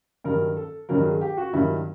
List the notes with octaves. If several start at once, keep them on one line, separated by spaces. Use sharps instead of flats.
G2 D#3 F#3 A#3 A#4
A4
G2 D#3 F#3 A#3 A#4
G#4
G4
F#4
G2 D#3 F#3 A#3 E4